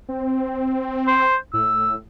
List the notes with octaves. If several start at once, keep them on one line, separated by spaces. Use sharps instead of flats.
C4
C5
A2 E6